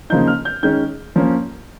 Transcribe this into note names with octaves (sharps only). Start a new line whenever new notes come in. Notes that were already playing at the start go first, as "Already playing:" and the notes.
C#3 F3 A#3 D#4 G6
F6
G6
D#3 G#3 C#4 G6
F3 A#3 C#4